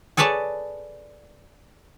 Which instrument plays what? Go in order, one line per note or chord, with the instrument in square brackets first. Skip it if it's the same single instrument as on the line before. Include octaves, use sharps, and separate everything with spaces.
[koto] G#4 A4 B4 C#5 D5 A5